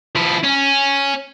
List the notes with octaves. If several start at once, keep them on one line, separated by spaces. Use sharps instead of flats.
F3 E4
C#4